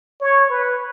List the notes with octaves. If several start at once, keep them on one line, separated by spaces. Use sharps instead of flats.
C#5
B4